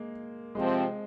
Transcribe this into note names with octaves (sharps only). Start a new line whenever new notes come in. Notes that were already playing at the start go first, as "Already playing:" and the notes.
Already playing: G#3 A#3
C3 F3 G#3 C4